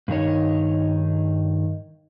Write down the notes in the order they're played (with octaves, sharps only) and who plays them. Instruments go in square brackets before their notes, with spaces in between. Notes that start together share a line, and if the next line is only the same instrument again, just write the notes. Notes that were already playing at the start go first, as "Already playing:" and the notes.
[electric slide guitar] G2 D#3 D#4 C#5